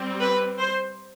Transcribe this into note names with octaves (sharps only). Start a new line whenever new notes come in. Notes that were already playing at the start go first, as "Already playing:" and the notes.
Already playing: G3 C4
B4
C5